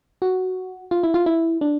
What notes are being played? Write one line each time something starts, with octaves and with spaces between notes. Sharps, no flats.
F#4
F4
E4
F4
E4
D4